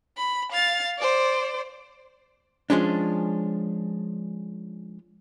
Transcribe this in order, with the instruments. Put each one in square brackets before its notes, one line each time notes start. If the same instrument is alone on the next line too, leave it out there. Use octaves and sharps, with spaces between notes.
[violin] B5
F5 A6
C5 D5
[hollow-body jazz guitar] F3 G#3 C#4 D4